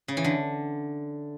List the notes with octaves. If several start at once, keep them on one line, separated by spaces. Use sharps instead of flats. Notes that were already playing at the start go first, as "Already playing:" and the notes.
C#3
E3
D3